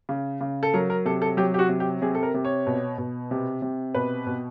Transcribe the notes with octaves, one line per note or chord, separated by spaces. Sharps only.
C#3
C#3
A4
F#3 A#4
A#4
C3 A4
A4
F#3 G4
G4
F#4
C3
G4
C3 G#4
A4
A#4
C3
C#5
B2
B2
C3
C3
B2 B4
B2